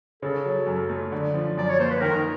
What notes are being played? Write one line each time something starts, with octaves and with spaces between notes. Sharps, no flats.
C#3 A4
F#3
F#2
A3
D3
F3
F#2 D5
C#5
A#3 C5
B4
D#3 A#4